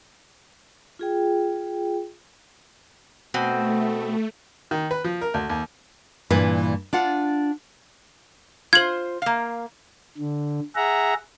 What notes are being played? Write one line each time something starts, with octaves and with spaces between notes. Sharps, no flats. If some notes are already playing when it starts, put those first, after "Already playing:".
F4 G#4 G5
B2 A3 C4
D#3
B4
F3
A#4
D2
D#2
G2 A#2 E3 B4
D4 F4 F#5
F4 C5 G#6 F#7
A#3 F5
D3
G#4 E5 F#5 A#5